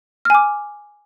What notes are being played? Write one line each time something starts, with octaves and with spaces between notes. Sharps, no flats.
G#5 D6 F6